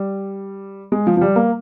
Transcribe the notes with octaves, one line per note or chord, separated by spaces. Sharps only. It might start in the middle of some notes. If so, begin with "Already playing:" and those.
Already playing: G3
G#3
F3
F3
G3
A#3